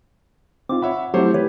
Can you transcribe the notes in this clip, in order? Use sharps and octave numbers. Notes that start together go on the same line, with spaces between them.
C4 D#4 F4 D6
C#5 E5 F#5 B5
F#3 A3 C4 E4 G4 C5 C#5
E3 G4 B4 C#5